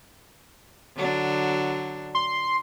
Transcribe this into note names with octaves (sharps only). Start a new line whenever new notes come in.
D3 F#3 D4
C6